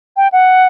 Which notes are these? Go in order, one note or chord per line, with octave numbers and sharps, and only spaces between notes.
G5
F#5